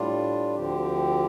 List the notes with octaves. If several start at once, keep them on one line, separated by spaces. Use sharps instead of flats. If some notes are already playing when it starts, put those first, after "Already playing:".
Already playing: A2 G3 D4 F4
D2 D3 F3 C4 G4